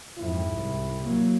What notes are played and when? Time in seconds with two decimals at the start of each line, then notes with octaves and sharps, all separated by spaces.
0.18 F2 G#2 E4
0.53 C2
1.02 F#3 A#3